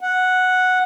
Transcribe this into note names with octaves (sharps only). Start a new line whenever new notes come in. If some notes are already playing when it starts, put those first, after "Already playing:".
F#5